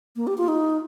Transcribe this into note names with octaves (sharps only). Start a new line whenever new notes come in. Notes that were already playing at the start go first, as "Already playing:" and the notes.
A#3
G4
F4
D#4